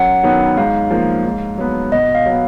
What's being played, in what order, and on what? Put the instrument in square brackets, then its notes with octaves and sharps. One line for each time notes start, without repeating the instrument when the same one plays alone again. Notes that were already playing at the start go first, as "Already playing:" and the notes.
Already playing: [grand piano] F#2 [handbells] F#5
[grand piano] D#3 F#3 B3
[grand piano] G#2 [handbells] F5
[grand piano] F3 A#3
G#2
F#3 B3
[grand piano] B2 [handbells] D#5
[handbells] F5
[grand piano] F#3 B3